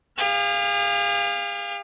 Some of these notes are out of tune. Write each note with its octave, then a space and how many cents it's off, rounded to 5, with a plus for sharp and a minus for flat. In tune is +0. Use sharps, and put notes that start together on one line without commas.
G#4 -45 F5 +0